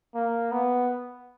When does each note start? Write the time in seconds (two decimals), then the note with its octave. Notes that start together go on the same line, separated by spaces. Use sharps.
0.14 A#3
0.52 B3